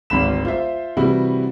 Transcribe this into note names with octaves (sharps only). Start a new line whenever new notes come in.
D1 G#1 B5 E7
F4 C5 E5
C3 E3 G3 E4 F#4